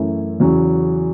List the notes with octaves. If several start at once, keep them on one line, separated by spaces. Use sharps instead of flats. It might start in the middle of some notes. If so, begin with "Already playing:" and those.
Already playing: F#2 E3 A3 C#4 E4
E2 C#3 F#3 C#4